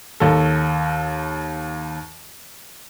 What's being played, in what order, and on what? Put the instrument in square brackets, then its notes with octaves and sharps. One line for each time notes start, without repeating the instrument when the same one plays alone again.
[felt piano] D#2 A4